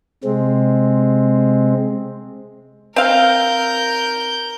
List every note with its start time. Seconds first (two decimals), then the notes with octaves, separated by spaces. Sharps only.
0.24 C3 G#3 C4
2.96 C4 A#4 F5 G6